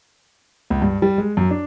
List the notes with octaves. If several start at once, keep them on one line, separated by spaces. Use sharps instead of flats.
C#2
G2
G3
G#3
F#2
D4